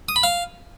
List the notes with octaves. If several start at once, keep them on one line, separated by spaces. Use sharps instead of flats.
D#6
B5
F5